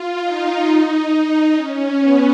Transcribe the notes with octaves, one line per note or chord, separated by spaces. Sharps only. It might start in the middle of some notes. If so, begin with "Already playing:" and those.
Already playing: F4
D#4
D#4
C#4
B3